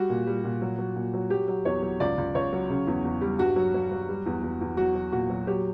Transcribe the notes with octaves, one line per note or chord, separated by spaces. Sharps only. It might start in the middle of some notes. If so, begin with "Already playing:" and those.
Already playing: G3 F#4
A#2
G3
A#2
F#3
F#3
A#2
F#3
F#3 G4
F#3
E2 C#5
F#3
C#2 D5
C#2
C#2 C#5
F#3
C#3
E2
E2
G3
G2 F#4
F#3
F#3
F#3
G3
E2
E2
E2
F#3 F#4
F#3
A#2 F#4
F#3
F#3 G4